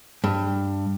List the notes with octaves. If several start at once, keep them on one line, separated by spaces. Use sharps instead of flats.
G2